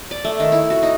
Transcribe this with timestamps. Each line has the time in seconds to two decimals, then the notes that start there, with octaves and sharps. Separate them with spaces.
0.11 D5
0.24 A3
0.40 D#3
0.52 E4
0.70 F#4
0.83 D#4